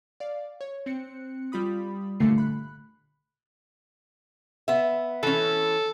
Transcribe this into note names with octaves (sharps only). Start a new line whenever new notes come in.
D5 F5
C#5
C4 F#6 C#7
G3 F4 B5 D#6
G1 A#2 D3 A3 C7 C#7
B5 F#6
B3 E5
E3 C#4 A4